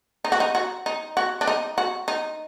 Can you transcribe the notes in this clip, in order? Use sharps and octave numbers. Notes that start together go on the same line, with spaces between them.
D#4
F#4
D#4
F#4
D#4
F#4
D4
D#4
F#4
D#4